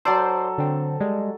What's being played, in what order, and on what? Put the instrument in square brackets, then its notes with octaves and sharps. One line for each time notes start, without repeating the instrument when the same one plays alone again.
[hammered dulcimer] F#3 A4 [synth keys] C5 D5
[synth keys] D3 C4
G3 G#3